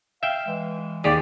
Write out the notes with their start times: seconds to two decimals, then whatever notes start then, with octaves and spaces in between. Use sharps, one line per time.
0.23 E5 F5 G5
0.47 E3 G#3
1.04 D#2 G4 G#4 D5